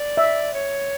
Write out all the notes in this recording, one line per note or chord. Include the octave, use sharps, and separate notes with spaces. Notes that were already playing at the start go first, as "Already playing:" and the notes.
Already playing: D5
E5
C#5